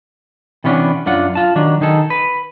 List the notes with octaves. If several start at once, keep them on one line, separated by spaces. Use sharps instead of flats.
C3 E3 B3 C#4 D4
F#2 D4 F4 F#5
F4 A5
D#3 F#3 D4
D#3 D#4 G#4 A4
B4